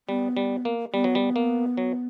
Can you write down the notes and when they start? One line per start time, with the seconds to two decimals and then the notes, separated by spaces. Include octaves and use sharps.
0.09 G3 B3
0.37 G3
0.65 A#3
0.93 G3 B3
1.04 F#3
1.15 G3
1.36 A#3
1.77 F#3